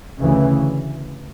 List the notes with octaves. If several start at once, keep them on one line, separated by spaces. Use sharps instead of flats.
D2 C#3 E3